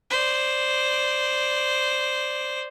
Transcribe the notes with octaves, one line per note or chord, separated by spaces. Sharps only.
C5 D5